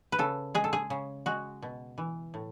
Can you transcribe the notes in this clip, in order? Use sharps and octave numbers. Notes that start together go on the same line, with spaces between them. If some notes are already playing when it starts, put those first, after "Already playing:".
B4
C#3 A4
G#3 G#4
A4
G#4
C#3
G#3 F#4
B2
E3
A2